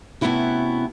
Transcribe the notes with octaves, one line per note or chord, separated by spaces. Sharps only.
C3 A3 B3 C#4 E4 F#4